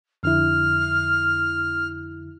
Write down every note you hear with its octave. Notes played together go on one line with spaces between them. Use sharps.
F2 D3 E4 F6